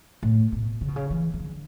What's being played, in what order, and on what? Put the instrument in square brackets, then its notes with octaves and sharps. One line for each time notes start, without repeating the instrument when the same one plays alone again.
[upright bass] A2
B2
C#3
B2
C#3
E3
E3
D3